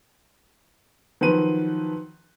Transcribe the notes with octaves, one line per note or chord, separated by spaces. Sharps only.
D#3 F3 F#3 B4 D#7